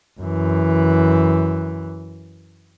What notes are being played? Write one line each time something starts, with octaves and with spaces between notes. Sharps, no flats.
F#2 E3